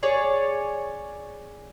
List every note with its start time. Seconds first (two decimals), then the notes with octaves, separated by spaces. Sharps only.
0.03 G#4 C#5 D5